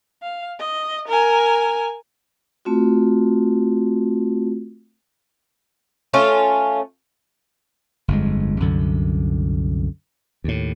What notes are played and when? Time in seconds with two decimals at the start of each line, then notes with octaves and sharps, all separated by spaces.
0.23 F5
0.60 D#5
1.08 A#4 G#5
2.65 A3 C4 F4 F#4
6.14 A3 C#4 F4
8.08 G1 F2 G#3
8.60 C2 F#2 D3
10.44 D#2 A2